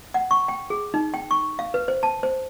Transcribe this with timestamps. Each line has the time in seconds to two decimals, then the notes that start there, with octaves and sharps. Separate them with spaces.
0.14 F#5
0.31 C#6
0.48 G5
0.70 G#4
0.94 D#4
1.14 G5
1.31 C#6
1.59 F5
1.74 B4
1.88 C5
2.03 A5
2.23 C5